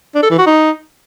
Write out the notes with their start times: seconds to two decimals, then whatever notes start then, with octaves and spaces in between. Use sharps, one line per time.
0.15 D4
0.23 A4
0.31 E3
0.38 F#4
0.46 D#4